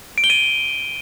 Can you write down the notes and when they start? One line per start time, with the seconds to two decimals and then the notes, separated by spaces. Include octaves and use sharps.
0.18 D7
0.24 G7
0.30 D#7